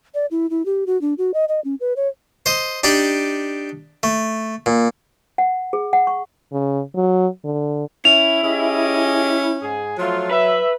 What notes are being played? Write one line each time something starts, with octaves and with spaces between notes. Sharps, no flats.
D5
E4
E4
G4
F#4
D4
F#4
D#5
D#5
C#4
B4
C#5
C5 D#5
D4 D#4 G4 D5
A3
A#2
F#5
G#4
F#5
C#6
C#3
F#3
D3
C#4 E4 F7
C#4 G4 G#4 D#5
G#2 G#4
F3 F#3 A3 F4
B4 E5